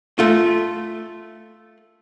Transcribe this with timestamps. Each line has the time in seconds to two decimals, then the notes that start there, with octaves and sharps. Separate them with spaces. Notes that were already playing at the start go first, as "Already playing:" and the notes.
0.19 A3 F4